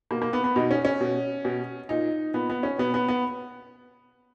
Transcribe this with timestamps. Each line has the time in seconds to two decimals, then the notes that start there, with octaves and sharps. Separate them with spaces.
0.11 B2 A#3
0.22 A#3
0.33 B3
0.44 B3
0.56 B2 D#4
0.71 C#4
0.85 C#4
1.00 B2
1.45 B2
1.89 A#2 D#4
2.34 A#2 B3
2.50 B3
2.63 C#4
2.78 B2 B3
2.94 B3
3.08 B3